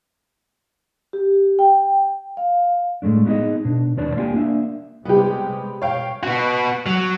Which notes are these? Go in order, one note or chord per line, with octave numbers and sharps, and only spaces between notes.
G4
G5
F5
A2 G#3 A3 D4
B3 D#4 E4 F#4 G#4 D#5
B2 D4
D#2 D4 B4 C#5 D5 A5
A#3 E4 F4 G4 G5 G#5
A#3 D4 E5
C3 G3 G#3 B3 G4
B2 C#5 F5 G5
B3 F#4
F#3